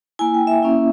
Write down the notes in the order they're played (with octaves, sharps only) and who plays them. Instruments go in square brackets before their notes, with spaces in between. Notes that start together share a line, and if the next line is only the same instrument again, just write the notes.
[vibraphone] A#3 E4 G#5
G5
E5
A#3 C#4 E4